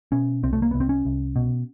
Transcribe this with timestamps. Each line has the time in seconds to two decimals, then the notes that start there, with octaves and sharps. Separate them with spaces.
0.12 B2 C#4
0.43 C2 C4
0.53 A3
0.62 A#3
0.71 C2 B3
0.80 C4
0.89 C#4
1.05 C2
1.36 B2